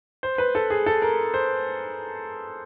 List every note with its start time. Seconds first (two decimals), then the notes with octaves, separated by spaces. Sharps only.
0.23 C5
0.38 B4
0.55 A4
0.70 G#4
0.86 A4
1.02 A#4
1.34 C5